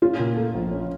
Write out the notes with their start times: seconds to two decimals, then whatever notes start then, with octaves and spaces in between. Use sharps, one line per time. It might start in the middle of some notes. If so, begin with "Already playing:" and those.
0.02 C#4 F4
0.19 A#2
0.36 A3
0.54 A#1
0.71 C#4